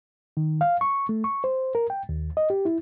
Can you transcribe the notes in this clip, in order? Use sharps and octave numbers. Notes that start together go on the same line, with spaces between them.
D#3
F5
C#6
A3
C#6
C5
A#4
G5
D#2
D#5
G4
E4